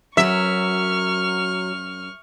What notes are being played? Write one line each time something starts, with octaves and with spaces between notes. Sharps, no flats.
F#2 F#3 E5 C#6 F6